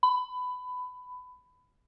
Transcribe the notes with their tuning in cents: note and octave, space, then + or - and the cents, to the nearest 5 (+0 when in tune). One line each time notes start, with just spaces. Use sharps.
B5 +20